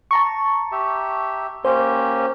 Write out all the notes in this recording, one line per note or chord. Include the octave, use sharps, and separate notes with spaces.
A5 A#5 C#6
G4 E5
A#3 C#4 G4 C5